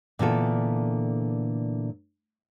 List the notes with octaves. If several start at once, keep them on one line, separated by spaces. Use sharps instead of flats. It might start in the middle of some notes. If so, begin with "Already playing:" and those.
A#2 D3 E3 B3 F4 A4